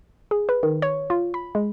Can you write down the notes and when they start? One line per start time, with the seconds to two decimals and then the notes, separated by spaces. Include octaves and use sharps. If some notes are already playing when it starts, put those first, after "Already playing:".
0.31 G#4
0.49 B4
0.63 D#3
0.82 C#5
1.10 F4
1.34 B5
1.55 G#3